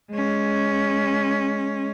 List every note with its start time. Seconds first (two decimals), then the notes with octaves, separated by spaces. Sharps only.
0.12 G#3 C#4